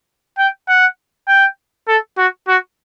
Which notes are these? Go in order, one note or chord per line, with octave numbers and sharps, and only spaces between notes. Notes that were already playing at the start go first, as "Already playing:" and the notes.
G5
F#5
G5
A4
F#4
F#4